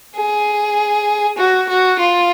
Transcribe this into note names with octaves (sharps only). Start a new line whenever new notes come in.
G#4
F#4
F#4
F4